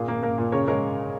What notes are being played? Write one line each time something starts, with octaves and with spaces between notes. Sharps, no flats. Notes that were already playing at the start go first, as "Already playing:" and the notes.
Already playing: A#2 G#4
A#3
A#3 A#4
A#2
C#3 A#4 C#5
G#3 A#4 C#5